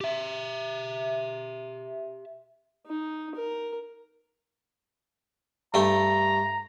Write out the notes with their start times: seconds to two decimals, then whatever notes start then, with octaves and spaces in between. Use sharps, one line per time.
0.01 G4 E5
2.87 D#4
3.35 A#4
5.74 G2 A3 G5 A#5